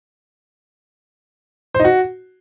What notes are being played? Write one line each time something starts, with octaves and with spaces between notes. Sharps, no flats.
C5
D#4
F#4